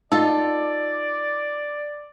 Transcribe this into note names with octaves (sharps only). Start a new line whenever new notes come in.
D#4 F4 A4 D5